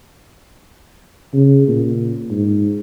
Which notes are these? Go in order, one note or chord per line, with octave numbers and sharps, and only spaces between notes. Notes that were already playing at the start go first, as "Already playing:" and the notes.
C#3
A#2
G#2